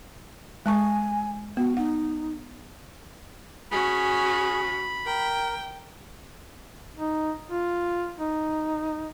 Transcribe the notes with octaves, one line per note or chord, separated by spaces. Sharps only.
G#3 G#5 A5 C#6
B3 F#4
D#4 F#5
C#4 F#4 G#4 B5
A#4 G5
D#4
F4
D#4